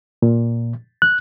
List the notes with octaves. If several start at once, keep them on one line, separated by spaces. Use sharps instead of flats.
A#2
F#6